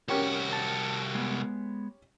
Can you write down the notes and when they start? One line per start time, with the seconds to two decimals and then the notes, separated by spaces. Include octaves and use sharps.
0.08 C2 C#4 F#4 G4 A#4
0.53 A5
1.15 G#3 B3